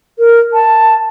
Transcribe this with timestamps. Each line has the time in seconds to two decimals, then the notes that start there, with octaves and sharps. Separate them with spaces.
0.19 A#4
0.54 A5